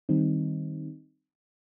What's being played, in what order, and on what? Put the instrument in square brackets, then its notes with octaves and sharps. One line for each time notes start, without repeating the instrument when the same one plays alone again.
[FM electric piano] D#3 G3 C4 D#4